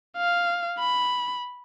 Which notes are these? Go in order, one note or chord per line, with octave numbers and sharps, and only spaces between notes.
F5
B5